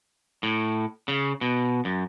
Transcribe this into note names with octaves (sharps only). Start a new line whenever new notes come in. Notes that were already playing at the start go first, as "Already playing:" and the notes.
A2
C#3
B2
F#2